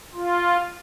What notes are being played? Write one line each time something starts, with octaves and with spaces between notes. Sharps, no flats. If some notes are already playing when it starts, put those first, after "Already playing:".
F4